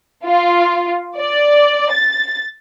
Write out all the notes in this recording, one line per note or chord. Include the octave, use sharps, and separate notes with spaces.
F4
D5
A6